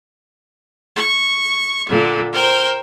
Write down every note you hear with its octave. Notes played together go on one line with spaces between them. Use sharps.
C#6
A#2 D3
A#4 C5 G5